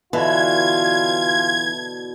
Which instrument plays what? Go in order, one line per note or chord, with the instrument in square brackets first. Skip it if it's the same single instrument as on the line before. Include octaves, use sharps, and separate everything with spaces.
[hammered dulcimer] B2 D3 [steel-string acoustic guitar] E3 [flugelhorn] F4 [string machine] G#6